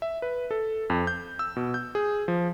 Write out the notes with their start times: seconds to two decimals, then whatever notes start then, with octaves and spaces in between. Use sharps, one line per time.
0.02 E5
0.22 B4
0.51 A4
0.90 F2
1.07 G6
1.39 E6
1.56 B2
1.74 G6
1.95 G#4
2.28 F3